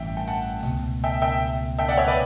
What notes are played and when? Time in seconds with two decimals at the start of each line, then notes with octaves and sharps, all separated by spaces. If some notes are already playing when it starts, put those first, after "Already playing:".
Already playing: A1 G2 E3 E5 G5
0.17 G5
0.27 F#5 A5
0.65 C#2 B2 A3
1.04 E5 G5
1.22 E5 G5
1.79 E5 G5
1.88 D5 F#5
1.98 C#5 E5
2.08 B4 D5